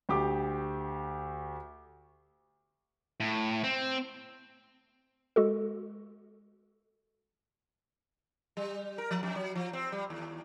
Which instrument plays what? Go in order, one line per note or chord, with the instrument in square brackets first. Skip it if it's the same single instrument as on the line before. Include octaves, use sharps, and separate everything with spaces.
[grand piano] D2 G4 D6
[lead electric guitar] A2
C4
[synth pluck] G#3 F#4 A4
[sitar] G3
A#4
F3
F2
F#3
F3
C4
G3
D#2